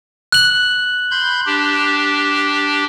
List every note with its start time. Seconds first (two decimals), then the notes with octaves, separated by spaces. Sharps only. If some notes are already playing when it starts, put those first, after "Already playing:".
0.32 F#6 F#7
1.11 B5 C6 G6
1.46 D4 G4